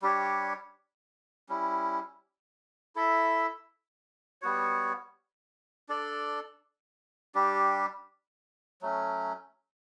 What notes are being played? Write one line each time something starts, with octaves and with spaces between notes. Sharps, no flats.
G3 D4 G4 C#5
G3 C#4 E4
E4 A4 E5
G3 B3 F#4 C#5
D4 A4 D5
G3 D4 G4
F#3 A3 C#4